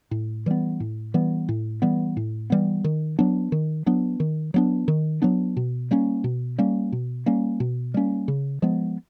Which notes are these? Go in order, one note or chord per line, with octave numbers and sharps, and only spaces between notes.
A2
E3 G3 B3
A2
E3 G3 B3
A2
E3 G3 B3
A2
E3 G3 B3
D#3
F#3 B3 D4
D#3
F#3 B3 D4
D#3
F#3 B3 D4
D#3
F#3 B3 D4
B2
G3 A#3 C#4
B2
G3 A#3 C#4
B2
G3 A#3 C#4
B2
G3 A#3 C#4
C#3
F3 G#3 B3